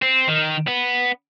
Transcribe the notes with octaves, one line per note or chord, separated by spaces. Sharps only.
C4
D#3
B3